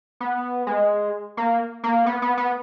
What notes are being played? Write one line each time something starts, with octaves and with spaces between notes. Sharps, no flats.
B3
G#3
A#3
A#3
B3
B3
B3